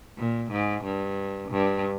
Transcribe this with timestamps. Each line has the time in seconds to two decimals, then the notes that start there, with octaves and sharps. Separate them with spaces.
0.18 A#2
0.51 G#2
0.84 G2
1.52 G2